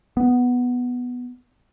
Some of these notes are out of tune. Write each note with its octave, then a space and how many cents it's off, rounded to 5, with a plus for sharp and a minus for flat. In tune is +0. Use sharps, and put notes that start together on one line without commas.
B3 +0